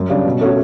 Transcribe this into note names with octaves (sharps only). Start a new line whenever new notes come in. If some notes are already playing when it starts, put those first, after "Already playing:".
Already playing: F#2
C#3 G3 D4
B2
A3 C#4 F#4